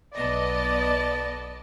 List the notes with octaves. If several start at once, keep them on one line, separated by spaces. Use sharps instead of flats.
B1 B3 B4 D5 D#5 A5